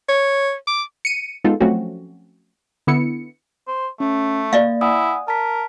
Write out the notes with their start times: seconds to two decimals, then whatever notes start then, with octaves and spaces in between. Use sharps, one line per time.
0.09 C#5
0.67 D6
1.05 C#7 D#7
1.44 G#3 B3 D#4 F4 A4
1.60 F3 F#3 A3 C4 C#4 F#4
2.87 D3 B3 E4 C#7
3.68 C5
4.00 A3 C#4
4.53 A#3 D5 D#5 F5
4.81 E4 F#5 G#5 D#6
5.28 A#4 A5 B6